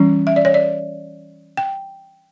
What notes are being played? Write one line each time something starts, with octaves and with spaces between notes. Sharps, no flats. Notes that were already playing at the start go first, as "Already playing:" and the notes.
Already playing: E3 G3 C#4
E5
D5
C#5
D5
G5